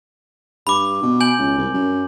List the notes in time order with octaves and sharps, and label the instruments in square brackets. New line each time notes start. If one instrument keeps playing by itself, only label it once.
[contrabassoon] G2 [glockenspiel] B5 D6
[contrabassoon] B2
[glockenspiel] G#5 G6 F#7
[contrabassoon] C#2
C2
F#2